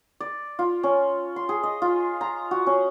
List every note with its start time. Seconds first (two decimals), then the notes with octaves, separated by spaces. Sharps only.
0.20 D5
0.59 F4
0.83 C#4
1.36 C6
1.49 G#4
1.63 D#5
1.82 F4
2.21 A#5
2.51 F#4
2.67 C#4